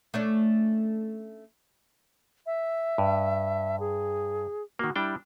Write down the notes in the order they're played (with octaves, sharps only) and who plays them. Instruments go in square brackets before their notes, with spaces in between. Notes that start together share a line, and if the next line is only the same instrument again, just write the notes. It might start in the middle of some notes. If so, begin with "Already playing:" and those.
[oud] A3 C#4 D4
[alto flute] E5
[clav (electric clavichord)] G2
[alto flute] G#4
[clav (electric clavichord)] D#3 A#3 [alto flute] F#4
[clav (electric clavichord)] G3 D4 G5 [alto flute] E4